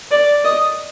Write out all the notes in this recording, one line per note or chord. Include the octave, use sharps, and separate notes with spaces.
D5
D#5